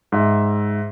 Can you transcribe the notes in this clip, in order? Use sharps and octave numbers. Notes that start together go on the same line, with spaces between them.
G#2 E5